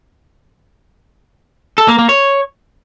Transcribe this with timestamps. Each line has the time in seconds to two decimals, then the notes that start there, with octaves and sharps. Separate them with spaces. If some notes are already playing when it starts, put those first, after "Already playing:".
1.78 A4
1.88 A#3
1.99 A#3
2.09 C#5